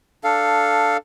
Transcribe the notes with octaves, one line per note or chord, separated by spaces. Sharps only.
D4 A4 F5